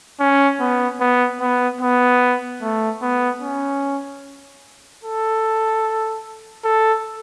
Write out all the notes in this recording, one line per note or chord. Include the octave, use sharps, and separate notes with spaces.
C#4
B3
B3
B3
B3
A3
B3
C#4
A4
A4